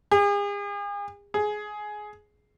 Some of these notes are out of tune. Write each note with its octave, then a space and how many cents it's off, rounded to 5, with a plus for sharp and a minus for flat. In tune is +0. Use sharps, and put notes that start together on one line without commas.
G#4 -40
G#4 +15